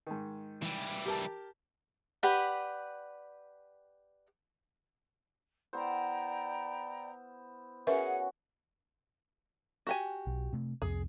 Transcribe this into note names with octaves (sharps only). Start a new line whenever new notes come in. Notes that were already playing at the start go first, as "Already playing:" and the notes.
G#2 D#3
E3 G3
G4 A#4 A5
G4 B4 D5 F#5
B3 E4 C5 D5 G5 A#5
C#4 F#4 G#4 A#4 B4 E5 F#5
F#4 G4 G#5
B1
C3 A3
C2 F2 C3 G#4